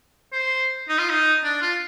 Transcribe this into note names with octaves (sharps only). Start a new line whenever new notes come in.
C5
D#4
F4
D#4
D4
F4